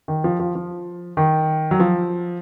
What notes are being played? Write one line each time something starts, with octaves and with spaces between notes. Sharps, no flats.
D#3
F3
F3
F3
D#3
F#3
F3